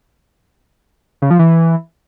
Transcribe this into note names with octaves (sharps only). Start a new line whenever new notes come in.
C#3
F3
E3